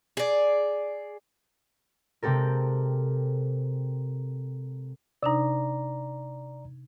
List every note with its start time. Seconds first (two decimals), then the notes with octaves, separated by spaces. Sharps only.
0.17 G#4 D5
2.22 C3 G#3 C4 G4 A4 A#4
5.23 C3 D4 D#4 D5 A#5